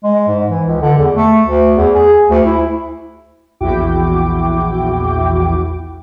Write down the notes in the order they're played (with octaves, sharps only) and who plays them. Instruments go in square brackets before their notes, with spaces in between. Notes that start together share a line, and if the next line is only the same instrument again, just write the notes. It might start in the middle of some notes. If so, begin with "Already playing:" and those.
[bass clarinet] G#3
G#2
E3
C#2
D3
E2
A3
D2
E2
G#4
D2
E4
[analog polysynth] A#1 E2 E4 F#4 G5 D6